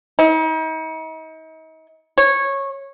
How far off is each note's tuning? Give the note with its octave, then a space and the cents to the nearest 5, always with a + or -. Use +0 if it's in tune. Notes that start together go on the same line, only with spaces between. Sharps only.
D#4 +40
C#5 -15